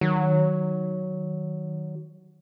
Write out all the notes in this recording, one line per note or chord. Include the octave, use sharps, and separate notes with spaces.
D#3 F#3